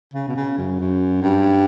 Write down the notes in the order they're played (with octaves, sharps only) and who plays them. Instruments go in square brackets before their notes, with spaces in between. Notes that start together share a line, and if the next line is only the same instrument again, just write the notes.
[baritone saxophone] C#3
B2
C#3
F#2
F#2
G2